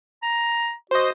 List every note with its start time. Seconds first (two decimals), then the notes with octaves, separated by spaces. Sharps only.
0.23 A#5
0.91 F#4 C5 D#5